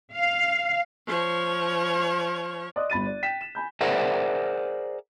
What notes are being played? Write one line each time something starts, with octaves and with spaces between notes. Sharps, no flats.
F5
F3 C#5
D5 D#5 C6 D6 D#6 F#6
G1 B5 A6 D#7
D5
G5 B6 E7
E7
G#5 B5 G6
G#4 A#4 C5 D5 E5 F#5